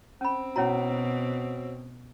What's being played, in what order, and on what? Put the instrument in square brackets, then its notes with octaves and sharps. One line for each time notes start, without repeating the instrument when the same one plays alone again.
[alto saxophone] C4 [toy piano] C#4 B5
[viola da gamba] B2 [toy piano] C#4 E4 A#5 [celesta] F#4 C#5 F#5